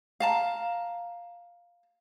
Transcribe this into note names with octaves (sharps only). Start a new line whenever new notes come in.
F5 A5 A#5